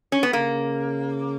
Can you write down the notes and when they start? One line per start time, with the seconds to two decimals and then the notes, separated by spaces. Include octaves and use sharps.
0.12 C#4
0.23 B3
0.33 C#3 A#3